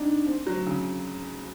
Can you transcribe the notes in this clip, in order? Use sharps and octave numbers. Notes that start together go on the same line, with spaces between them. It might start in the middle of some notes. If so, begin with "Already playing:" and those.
Already playing: C4 D4 D#4
C4
F#3
C#3